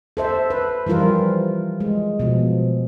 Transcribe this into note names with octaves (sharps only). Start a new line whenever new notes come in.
A4 C5 E5
B4
E3 F3 G3 F4 A#4
G#3
B2 F3